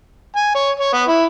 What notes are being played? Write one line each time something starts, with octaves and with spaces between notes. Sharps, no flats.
G#5
C#5
C#5
B3
E4